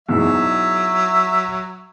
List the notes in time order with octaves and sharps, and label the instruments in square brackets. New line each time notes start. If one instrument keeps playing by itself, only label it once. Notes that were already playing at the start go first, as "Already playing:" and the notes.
[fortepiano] E2 G#2 B2 [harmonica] F#3 E5